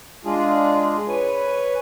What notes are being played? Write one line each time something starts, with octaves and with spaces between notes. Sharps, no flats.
G#3 D4 F4 G#4
B4 C#5 G#5